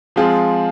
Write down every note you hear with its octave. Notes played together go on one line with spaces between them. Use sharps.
F3 G#3 C4 F4 G#4